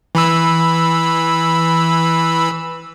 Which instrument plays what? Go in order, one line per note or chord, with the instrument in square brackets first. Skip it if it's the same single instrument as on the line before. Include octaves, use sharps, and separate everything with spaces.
[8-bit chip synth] E3 B5 E6